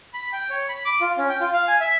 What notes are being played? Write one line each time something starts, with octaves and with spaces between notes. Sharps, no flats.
B5
G5
C#5
B5
D6
F4
C#4
G5
F4
F5
G#5
E5